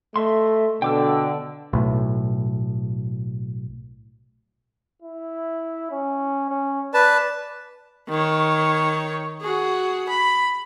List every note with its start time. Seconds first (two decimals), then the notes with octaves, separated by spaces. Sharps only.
0.16 A3 D#5 E5 C6
0.82 B2 D3 G5 D6 E6
1.73 B1 A2
5.02 E4
5.91 C#4
6.50 C#4
6.94 B4 D5 A5
8.09 D#3 C#5
9.42 F#4 G#4
10.09 B5